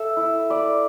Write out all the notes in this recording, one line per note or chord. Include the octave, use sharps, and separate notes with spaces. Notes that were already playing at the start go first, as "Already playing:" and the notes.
Already playing: A4 E5
E4
B4 D5